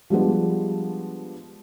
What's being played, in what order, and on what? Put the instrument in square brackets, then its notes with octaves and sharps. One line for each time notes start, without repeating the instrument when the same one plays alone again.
[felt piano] F3 G3 G#3 B3 D4